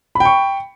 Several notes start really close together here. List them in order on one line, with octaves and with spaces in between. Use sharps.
B5 G5 C#6